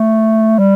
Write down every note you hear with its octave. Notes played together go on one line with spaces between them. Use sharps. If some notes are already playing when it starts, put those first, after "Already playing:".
Already playing: A3
G3